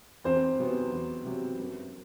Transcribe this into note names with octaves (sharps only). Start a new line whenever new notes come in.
E2 C4 C5
C3 F#3 B3
E2
C3 F#3 B3
F#2